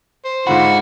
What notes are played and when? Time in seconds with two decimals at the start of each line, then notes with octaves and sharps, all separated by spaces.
0.25 C5
0.47 G#2 D3 F4 F#4 B5